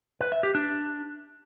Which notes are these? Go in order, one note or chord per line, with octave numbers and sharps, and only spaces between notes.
B4
E5
G4
D4